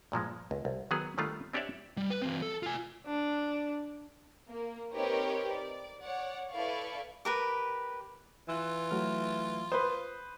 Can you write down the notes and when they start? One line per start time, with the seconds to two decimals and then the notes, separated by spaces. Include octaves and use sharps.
0.12 G2 A#2 F3 G#3
0.51 C#2
0.65 C2
0.91 D#3 F#3 B3 G#4
1.18 D3 D#3 G3 A3 D4 F4
1.53 C4 D4 G4 C#5 D5 E5
1.97 G3
2.10 B4
2.22 E3 C4
2.42 A4
2.63 F4 G#5
3.07 D4
4.49 A#3
4.93 C4 D#4 G4 A#4 B4 C#5
5.51 D5
6.01 C#5 D5 F#5
6.51 E4 A4 B4 D5 F5 C#6
7.25 G4 A#4 B4
8.49 E3 F4 E6 F#6
8.91 F#3 A3 F6
9.72 B4 C5 D#6